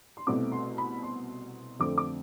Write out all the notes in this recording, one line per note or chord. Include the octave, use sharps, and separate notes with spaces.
C6
C2 B2 A3 C4 D6
C6
B5
C6
F2 D3 A3 C4 D6
D6